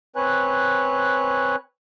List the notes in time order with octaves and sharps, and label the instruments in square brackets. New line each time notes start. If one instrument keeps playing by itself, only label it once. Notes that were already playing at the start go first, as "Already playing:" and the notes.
[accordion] C4 B4 C#5 G#5 F#6